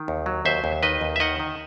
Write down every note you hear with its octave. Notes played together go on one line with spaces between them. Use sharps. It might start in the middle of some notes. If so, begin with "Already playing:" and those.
Already playing: D#3
D#2
F#3
D#2 C5 E5
D#2
D#3 B4 D#5
D#2
E5
D#3 D#5 F#5
D#3